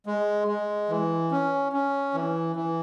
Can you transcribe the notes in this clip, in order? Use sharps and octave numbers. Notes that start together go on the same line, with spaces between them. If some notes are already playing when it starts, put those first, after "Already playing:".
G#3
G#3
E3
C#4
C#4
E3
E3